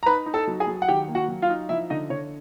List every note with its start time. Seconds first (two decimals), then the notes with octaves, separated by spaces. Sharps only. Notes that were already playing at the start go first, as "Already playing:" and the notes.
0.03 A#5
0.06 D#4 B4 B5
0.26 D#4
0.34 A4 A5
0.47 F#3
0.60 G#4 G#5
0.67 F#3
0.82 F#5
0.88 D#3 G4 G5
1.08 A#3
1.15 F#4 F#5
1.28 F#3
1.42 F4 F5
1.50 D#4
1.69 F3 E4 E5
1.90 D3 D#4 D#5
2.10 D3 C#5